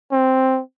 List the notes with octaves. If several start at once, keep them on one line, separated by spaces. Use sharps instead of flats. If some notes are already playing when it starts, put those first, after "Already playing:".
C4